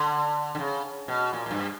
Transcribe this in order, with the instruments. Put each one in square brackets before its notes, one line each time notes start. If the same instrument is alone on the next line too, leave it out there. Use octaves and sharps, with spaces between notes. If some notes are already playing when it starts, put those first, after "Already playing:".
Already playing: [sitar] D3
D3
C#3
B2
A#2
A#2
G2